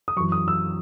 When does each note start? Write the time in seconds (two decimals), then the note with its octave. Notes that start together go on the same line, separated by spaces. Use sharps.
0.08 D#6
0.16 F#2 C#6
0.20 E3
0.32 D#6
0.48 E6